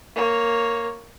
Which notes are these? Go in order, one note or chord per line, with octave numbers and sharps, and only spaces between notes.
A#3 C#5